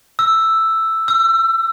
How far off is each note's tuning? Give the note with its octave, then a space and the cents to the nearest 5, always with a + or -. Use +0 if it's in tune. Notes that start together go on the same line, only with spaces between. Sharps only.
E6 +5
E6 +30